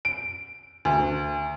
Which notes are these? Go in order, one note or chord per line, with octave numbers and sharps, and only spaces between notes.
D7
D2